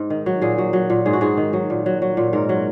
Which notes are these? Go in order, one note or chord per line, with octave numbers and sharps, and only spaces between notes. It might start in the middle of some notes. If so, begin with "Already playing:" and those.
Already playing: G#2
D#3
F#3
A#2 G#4
F#3
F#3
A#2
G#2 G#4
F#4
G#2 G#4
D#3
F#3
A#2
F#3
F#3
A#2
G#2 A#4
F#3